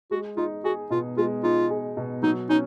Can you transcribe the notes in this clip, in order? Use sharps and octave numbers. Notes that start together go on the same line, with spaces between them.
G#3 F#4
D#4 F4
F#4 G#4
B2 F4
G#3 F4
D#4 F4
G#4
B2
F#3 D#4
C#4 D#4